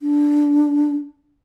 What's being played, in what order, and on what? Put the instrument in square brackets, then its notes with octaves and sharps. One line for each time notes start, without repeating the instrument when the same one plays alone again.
[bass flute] D4